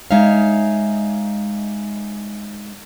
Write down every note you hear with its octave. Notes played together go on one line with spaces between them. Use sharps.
G#3 D#4 C#5 E5 F5